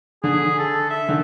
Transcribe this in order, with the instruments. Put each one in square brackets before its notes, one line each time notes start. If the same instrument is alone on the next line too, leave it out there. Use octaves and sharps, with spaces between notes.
[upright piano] D3 [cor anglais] G#4
[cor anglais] A4
E5
[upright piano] D3 D#3